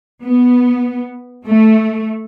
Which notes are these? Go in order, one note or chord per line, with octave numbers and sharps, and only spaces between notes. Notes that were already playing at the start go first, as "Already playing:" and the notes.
B3
A3